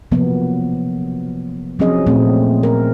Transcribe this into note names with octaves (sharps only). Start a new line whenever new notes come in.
C3 F3 F#3 A#3 B3
F3 F#3 C4 C#4 G#4 D#5
A#2 A3 C4
A#4